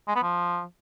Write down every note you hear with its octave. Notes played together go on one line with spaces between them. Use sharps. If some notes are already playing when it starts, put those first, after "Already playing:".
G#3
B3
F3